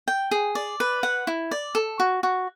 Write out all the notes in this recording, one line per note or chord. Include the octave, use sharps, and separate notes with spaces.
G5
G#4
D5
B4
F#5
E4
D5
A4
F#4
F#4